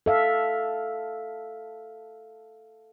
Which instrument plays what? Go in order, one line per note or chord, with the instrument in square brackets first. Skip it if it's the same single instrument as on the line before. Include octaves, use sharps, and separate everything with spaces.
[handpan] A4 E5 F5